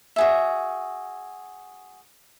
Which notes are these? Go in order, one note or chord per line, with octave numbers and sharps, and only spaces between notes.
F#4 G#4 E5